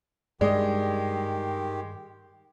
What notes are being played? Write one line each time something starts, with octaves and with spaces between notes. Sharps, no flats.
G2 D#3 G#3 G4 D5 D#5